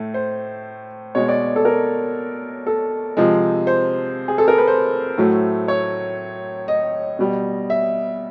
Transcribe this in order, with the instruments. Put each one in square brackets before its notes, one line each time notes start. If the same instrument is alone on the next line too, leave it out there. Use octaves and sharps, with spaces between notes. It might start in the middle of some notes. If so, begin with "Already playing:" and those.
Already playing: [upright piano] A2 A3
C5
B2 G#3 C#5
D5
A4
A#4
A4
C3 F3 G#3
C5
G#4
A4
A#4
B4
C5
A2 F#3 A3
C#5
D#5
B2 G3
E5